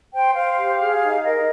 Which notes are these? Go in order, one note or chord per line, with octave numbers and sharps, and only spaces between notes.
C5 G5
C5 F5
G4
G#4
D#4
A#4 D#5